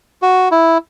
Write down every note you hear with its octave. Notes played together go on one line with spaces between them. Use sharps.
F#4
E4